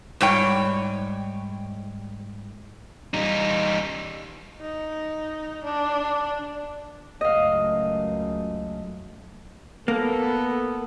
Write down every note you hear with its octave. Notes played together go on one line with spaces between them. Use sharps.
G#2 G3 C#5 G5
G3 D#4
D#4
D4
C#2 F#2 A3 D#5 F5
A#3 B3 A4